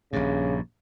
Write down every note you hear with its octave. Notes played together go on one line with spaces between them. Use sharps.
A#1 G2 C#3